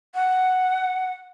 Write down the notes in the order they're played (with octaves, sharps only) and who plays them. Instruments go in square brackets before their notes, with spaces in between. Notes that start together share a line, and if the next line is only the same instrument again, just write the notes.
[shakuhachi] F#5